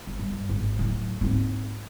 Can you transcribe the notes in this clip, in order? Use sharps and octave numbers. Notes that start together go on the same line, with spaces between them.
G1
G2
G#1
A2 F#3
G#2 C4